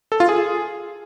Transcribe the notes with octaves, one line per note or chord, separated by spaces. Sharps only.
A4
F4
G#4